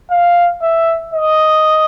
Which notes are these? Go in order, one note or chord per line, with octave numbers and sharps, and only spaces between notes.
F5
E5
D#5